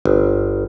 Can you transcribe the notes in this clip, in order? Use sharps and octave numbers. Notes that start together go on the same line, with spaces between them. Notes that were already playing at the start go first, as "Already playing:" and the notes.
G1